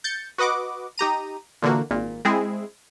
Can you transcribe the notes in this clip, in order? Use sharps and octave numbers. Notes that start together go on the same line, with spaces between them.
G6 A6 C#7
F#4 B4 D#5 F#5 D6
D#4 G4 A#5 D#7
A#2 D3 E3 A#3 F#4
G#1 A#2
G#3 C4 E4 G#4